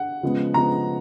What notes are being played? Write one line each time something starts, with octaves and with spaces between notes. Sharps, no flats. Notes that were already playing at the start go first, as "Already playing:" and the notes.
Already playing: F#5
C#3 F3 G#3 B3
C#3 F3 G#3 B3 A#5